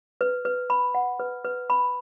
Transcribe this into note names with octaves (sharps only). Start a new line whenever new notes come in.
B4
B4
B5
F#5
B4
B4
B5